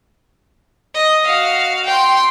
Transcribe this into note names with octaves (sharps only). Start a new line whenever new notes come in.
D#5
F#4 F5
G5 C6